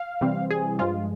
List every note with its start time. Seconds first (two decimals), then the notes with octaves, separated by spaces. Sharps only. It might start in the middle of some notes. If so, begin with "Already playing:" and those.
Already playing: F5
0.21 C3 E3 G3 C4
0.50 G#4
0.79 G2 F3 G#3 F4